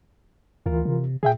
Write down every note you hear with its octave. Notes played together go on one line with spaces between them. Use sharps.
D2 E3 F4 A#4
C3
A#2 G#4 E5 G5